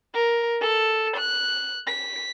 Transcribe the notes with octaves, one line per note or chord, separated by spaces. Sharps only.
A#4
A4
F#6
B6